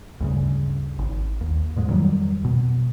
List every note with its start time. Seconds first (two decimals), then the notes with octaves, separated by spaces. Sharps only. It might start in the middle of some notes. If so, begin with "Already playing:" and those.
0.20 D2 G2 C#3
0.99 G#1
1.41 D#2
1.76 E2 G#2 G#3
1.89 F2 D#3 F#3 G3
2.44 B2